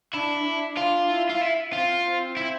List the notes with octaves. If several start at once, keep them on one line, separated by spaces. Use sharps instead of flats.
D4 E4
D4
F4
E4
F4
E4
C4 F4
C4
E4